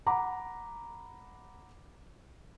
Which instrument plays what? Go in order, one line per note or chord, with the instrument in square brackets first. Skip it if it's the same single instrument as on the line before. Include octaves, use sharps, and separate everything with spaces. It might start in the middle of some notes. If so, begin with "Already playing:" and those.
[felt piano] F#5 A#5 B5 D6